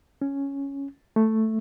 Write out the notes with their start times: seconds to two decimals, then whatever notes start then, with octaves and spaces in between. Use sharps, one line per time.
0.22 C#4
1.16 A3